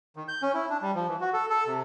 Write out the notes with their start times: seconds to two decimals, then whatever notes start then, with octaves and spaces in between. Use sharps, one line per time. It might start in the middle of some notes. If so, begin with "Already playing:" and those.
0.16 D#3
0.28 G6
0.42 C#4
0.54 E4
0.70 D4
0.82 G3
0.95 F3
1.08 E3
1.21 F#4
1.33 A4
1.50 A4
1.67 C3